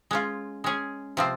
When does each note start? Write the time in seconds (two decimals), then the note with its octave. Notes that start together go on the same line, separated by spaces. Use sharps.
0.11 G#3 C#4 F4
0.64 G#3 C#4 G#4
1.17 C3 F3 C4